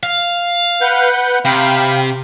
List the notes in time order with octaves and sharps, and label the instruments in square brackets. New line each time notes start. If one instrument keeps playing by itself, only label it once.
[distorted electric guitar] F5
[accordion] B4 F#5 G6
[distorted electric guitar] C3 [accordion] F5 G5 B5